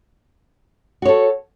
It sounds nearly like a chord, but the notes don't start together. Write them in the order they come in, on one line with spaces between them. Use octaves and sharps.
F#4 C#5 A4